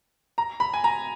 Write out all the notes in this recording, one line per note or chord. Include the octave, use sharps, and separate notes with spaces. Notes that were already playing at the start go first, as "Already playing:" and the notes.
A#5
B5
G#5
A#5